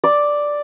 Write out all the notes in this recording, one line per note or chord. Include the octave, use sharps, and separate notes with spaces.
D5